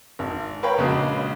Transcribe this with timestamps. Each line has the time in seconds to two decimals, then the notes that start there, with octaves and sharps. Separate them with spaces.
0.19 G#1
0.63 A#4 B4 C#5 F5 G5 B5
0.78 A#1 C#3 G#3 F#4